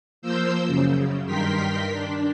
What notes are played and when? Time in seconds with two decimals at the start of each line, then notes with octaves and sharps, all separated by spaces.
0.22 F3 A#3 C5 E6 G6
0.66 F#2 C#3
1.26 G2 D#3 A#4 G5 C6 B6
1.92 D4